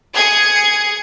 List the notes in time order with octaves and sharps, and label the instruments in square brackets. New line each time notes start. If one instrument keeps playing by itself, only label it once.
[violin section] G#4 G#6 C#7